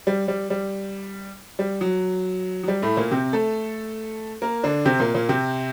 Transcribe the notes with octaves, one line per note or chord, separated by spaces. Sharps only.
G3
G3
G3
G3
F#3
F#3
G3
A2 A3
A#2 A#3
C3 C4
A3 A4
A#3 A#4
D3 D4
C3 C4
A#2 A#3
A#2 A#3
C3 C4